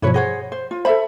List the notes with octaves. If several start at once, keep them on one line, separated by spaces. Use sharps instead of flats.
G2 B2 F3 E4 B4 C#5
G#4 C5 C#5 F#5 A#6
C5
F4
A4 C5 E5 B5